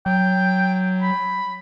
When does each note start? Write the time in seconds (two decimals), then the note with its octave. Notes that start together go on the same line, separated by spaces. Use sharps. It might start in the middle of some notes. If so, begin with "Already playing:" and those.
0.06 F#3 G5
1.02 B5